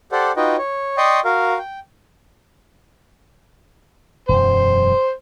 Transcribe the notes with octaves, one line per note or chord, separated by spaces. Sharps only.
G4 A4 C5 D5 F#5
D#4 F4 F#4 B4 D#5 G5
C#5
D5 D#5 G5 C6 C#6 D#6
F#4 A#4 F5
G5
E1 F#2 F#3 C5